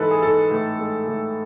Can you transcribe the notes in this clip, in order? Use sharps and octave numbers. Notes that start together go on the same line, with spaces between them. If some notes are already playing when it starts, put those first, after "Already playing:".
Already playing: G#2 E3 A4 B4
G#4
G#2 A4
A2
G#3
A2